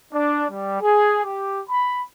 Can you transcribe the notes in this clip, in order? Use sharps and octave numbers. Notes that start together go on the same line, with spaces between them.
D4
G3
G#4
G4
B5